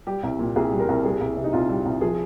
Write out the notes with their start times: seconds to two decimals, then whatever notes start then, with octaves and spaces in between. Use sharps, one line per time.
0.06 G3 G4
0.23 C2
0.39 A#2
0.56 C2 G#4
0.72 G3
0.79 A#4
0.89 C2
1.04 G3 G#4
1.21 C2
1.37 C3
1.44 D#4
1.53 C2 F4
1.69 G3
1.85 C2
2.01 F3 G#4